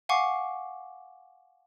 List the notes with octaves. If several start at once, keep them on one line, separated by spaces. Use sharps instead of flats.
F5 F#5 G#5 C#6 D6 C7